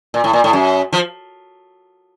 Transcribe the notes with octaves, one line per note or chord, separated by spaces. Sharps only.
A#2
A2
A#2
A2
F#2
F3